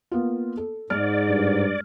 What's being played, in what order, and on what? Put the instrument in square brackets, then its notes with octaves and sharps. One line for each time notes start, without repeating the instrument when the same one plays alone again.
[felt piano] A#3 B3 F4
A4
[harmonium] G#2 [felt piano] G#3 F6 [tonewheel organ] D5
[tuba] G2